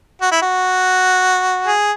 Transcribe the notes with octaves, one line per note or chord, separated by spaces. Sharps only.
F#4
E4
F#4
G#4